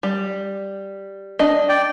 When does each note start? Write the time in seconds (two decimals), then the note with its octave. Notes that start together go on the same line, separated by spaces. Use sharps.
0.03 G3
1.39 D4 D#5
1.69 D5 G5